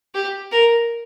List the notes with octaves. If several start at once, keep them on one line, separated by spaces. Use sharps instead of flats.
G4
A#4